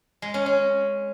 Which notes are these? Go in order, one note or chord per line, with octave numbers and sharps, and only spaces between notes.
G#3
C#4
C#4